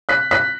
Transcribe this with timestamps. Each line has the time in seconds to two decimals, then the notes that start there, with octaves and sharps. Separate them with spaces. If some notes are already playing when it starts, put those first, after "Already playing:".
0.09 F#6 B6
0.31 F#6 B6